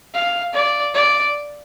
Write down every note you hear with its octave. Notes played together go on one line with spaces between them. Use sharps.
F5
D5
D5